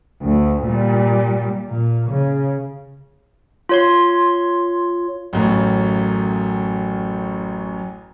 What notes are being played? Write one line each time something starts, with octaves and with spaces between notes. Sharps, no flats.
D2
A#2 G3
A#2
C#3
F4 C#5 C6
A1 F#2 A2